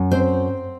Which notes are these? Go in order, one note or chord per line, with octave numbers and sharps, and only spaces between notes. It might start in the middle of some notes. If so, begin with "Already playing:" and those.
Already playing: F#2
C4 C5